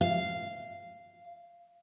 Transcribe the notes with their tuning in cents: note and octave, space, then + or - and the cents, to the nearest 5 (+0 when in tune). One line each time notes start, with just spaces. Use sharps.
F5 -10